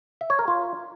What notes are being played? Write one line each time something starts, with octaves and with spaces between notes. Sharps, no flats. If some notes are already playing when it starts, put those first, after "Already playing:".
E5
C#5
A#4
F4